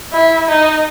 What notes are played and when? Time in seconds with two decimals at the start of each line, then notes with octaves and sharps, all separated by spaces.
0.13 E4
0.48 D#4